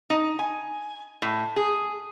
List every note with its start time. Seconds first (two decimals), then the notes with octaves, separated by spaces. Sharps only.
0.10 D#4
0.39 G#5
1.22 A2
1.56 G#4